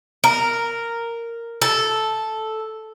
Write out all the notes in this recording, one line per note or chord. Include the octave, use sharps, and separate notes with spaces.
A#4
A4